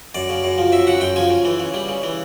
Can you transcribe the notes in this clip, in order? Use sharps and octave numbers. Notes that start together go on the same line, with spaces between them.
F#2 D5
C#3
F#2
F3
F#2 E5
C#3 F#5
F#2 G5
F3 G#5
C#3
E3
C#3
G3
C#3
E3